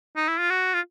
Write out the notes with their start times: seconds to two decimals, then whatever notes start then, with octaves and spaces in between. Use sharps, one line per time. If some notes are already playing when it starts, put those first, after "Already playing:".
0.16 D#4
0.28 E4
0.39 F4
0.50 F#4
0.74 F4